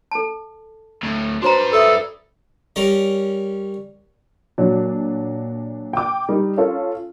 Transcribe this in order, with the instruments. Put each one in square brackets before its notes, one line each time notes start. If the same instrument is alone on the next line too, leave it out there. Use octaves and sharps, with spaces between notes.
[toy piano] A4 A5
[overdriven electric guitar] D2 A2
[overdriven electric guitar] D4 B4 [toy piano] F#4 C5 A#5
[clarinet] A4 [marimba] D5 E5 D#6
[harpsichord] G3 C#4 A#4
[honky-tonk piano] A#2 F#3 D4
G5 D6
G3 D#4
C#4 F4 A4